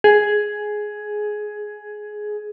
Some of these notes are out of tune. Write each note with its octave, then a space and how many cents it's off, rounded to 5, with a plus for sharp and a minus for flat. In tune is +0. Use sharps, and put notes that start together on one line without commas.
G#4 +10